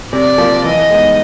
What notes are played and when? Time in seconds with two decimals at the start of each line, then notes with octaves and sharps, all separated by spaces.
0.12 C3 D5
0.38 F3 A#3
0.64 E3 D#5
0.90 G#3 B3 D#4